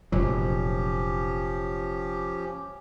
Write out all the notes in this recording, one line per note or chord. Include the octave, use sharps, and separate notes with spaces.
F1 A#2 F3 F#3 C#4 G4